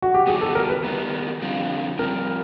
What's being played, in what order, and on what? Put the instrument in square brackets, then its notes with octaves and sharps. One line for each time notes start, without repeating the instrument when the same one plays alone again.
[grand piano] F#4
G4
[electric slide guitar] D#3 G3 B3 [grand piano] G#4
[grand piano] A4
A#4
B4
[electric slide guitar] D#3 G3 B3 [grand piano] A#4
[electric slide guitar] F2 D3 G3 C4 F4
[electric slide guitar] F2 D3 G3 C4 F4 [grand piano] A#4